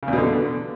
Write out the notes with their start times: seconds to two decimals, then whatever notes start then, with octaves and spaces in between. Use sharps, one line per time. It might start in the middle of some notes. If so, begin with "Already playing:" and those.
0.03 C#3
0.08 E2
0.13 B2
0.18 D3